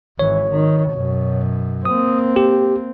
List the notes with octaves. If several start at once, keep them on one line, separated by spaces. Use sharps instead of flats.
G#1 E3 C#5
D#3
F#2 B2
A#3 C4 D#6
G4